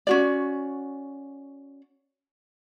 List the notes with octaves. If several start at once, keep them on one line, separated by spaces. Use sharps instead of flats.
C#4 F#4 D5